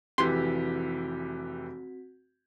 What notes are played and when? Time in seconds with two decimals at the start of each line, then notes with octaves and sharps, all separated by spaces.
0.18 F1 E3 C4 F#4 G4 C6 B6